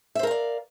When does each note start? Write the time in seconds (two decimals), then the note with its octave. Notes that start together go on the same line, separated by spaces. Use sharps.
0.15 E5
0.19 C5
0.23 A#4
0.27 F5
0.31 D5